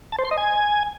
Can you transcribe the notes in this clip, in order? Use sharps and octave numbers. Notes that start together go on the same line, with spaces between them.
A5
C5
C6
D#5
G#5